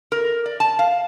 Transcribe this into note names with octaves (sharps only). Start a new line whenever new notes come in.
A#4
D5
A5
F5